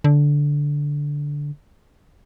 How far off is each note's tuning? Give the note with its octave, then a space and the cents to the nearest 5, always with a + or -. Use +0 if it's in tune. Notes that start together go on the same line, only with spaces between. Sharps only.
D3 -10